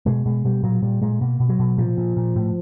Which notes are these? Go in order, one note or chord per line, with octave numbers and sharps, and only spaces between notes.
B2 G#3
B2 G#3
B2 G3
A#2 F#3
A#2 G3
A#2 G#3
B2 A#3
B2
F#3
B2
A#2 F3
A#2
A#2
A2